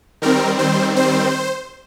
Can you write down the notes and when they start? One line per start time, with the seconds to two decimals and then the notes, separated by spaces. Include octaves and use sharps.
0.22 D#3 G3 C4 A#4
0.59 C5
0.96 C5